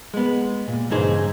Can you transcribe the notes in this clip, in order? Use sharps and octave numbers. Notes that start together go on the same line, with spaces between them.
G#3 B3
A#2
G2 C#3 E3 D#4 G#4 C5